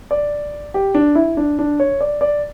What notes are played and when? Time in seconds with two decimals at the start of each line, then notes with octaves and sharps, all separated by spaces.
0.11 D5
0.74 G4
0.95 D4
1.15 E4
1.37 D4
1.59 D4
1.80 C#5
2.01 D5
2.21 D5